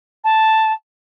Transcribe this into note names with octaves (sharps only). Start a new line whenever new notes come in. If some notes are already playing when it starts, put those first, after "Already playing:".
A5